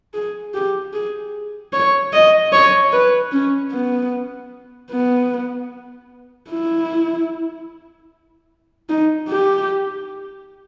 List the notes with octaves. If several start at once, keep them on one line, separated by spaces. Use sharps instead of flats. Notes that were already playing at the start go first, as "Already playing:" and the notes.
G#4
G4
G#4
C#5
D#5
C#5
B4
C#4
B3
B3
E4
D#4
G4